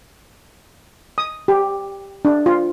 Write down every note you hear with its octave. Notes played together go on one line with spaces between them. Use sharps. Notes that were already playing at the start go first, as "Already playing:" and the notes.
D#6
G4
D4
F4